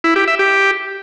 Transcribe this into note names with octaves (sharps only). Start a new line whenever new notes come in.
E4
G4
E5
G4